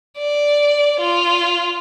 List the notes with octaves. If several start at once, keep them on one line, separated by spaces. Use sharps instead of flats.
D5
F4